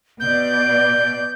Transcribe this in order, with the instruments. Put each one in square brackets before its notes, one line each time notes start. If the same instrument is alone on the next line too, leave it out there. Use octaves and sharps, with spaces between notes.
[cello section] B2 D5 [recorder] G6